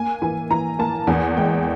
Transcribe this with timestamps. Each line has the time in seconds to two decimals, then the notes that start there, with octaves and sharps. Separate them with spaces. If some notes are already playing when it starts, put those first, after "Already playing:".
Already playing: A#3 G#5
0.22 E3 G#5
0.51 E3 A#5
0.79 A#3 A5
1.07 E2 G#5
1.37 G#3 G5